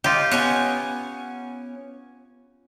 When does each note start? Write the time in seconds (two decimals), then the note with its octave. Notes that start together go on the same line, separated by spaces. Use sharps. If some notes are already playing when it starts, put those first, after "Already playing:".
0.04 D#4 F4 G4
0.31 B3 C#4 G#5